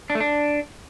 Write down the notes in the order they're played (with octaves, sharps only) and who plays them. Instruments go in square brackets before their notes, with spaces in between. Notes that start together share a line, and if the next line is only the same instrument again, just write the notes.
[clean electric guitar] D4
A3
D4